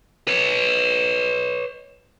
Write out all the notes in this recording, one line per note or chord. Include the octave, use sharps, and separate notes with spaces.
B4 C#5